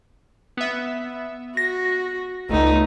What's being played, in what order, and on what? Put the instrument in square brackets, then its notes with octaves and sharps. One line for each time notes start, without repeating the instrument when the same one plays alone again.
[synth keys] B3 E5
[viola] F#4 [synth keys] A#6
[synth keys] G1 C#2 [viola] A3 D#4